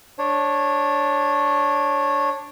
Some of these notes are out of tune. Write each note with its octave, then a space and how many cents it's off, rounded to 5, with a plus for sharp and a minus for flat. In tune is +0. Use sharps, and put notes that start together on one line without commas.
D4 +0 C#5 -15